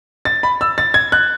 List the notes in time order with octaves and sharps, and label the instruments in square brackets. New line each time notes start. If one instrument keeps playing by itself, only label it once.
[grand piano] A6
B5
E6
A6
G#6
F#6